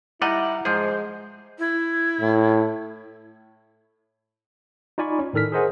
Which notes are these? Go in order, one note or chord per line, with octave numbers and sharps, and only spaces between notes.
G3 D#4 E4 D5 D#5 F#5 A#5
G#2 F3 G#3 G#4 C5
E4
A2
D#4 F4 D5 G#5 B5 C#6
C#4
A2 D#3 A4 F6 B6
G#4 A#4 C5 D#5 F#5 G#5